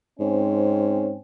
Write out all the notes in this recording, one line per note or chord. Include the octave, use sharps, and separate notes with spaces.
G#2 C4 C#4